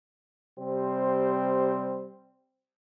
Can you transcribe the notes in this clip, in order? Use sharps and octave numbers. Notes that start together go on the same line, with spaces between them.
C3 G3 C4 C5